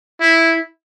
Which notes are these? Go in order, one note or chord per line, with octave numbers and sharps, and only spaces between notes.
E4